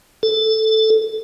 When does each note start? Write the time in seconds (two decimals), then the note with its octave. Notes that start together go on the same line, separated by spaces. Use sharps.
0.23 A4